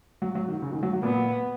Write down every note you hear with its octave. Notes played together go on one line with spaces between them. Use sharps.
F#3
F#3
D#3
C#3
D#3
F#3
F#3
A#2 B3